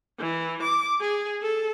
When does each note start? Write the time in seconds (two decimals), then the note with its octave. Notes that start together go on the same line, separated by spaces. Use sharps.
0.19 E3
0.62 D6
1.01 G#4
1.42 A4